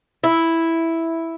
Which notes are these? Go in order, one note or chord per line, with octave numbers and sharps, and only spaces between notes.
E4